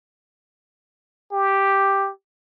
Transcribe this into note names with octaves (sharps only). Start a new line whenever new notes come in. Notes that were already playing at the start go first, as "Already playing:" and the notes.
G4